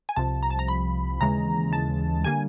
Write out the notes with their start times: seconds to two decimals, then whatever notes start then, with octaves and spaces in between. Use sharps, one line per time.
0.09 G#5
0.16 C2 C3 F3 A5
0.43 A#5
0.50 A5
0.59 A#5
0.68 B5
1.21 D#2 C#3 E3 G#3 A#5
1.73 A5
2.24 D3 G3 A#3 G#5